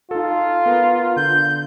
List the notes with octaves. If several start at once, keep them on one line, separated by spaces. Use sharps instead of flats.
D#4 F4 A4
B3 A#4 B4
D3 G6